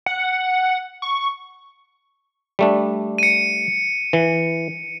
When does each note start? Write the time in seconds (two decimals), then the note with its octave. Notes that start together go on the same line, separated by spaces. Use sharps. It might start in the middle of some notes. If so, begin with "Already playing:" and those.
0.06 F#5
1.02 C#6
2.59 G3 A3 D4
3.18 C#7 D#7
4.13 E3